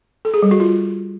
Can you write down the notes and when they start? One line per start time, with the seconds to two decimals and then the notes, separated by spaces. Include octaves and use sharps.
0.25 A4
0.34 G#4
0.42 G3
0.51 F#4
0.60 F4